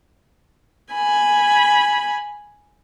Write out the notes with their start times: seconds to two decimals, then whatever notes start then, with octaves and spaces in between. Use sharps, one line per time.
0.94 G#5 B5